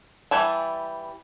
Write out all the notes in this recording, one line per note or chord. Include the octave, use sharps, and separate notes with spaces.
E3 G3 G#5 A5